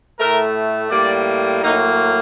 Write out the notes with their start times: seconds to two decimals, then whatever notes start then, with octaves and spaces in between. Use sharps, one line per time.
0.19 A2 A3 A#4
0.90 A2 G3 A#3 D5
1.63 A2 F#3 A#3 D#4